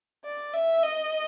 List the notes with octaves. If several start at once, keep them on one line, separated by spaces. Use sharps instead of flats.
D5
E5
D#5